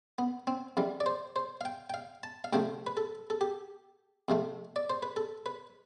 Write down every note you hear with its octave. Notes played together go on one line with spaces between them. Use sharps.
B3
C4
F2 E3 G3
D5
C5
C5
F5
G5
G5
F5
A5
F5
D2 C3 F3 A3 G5
B4
A4
A4
G4
F2 C3 F3 A3
D5
C5
B4
A4
B4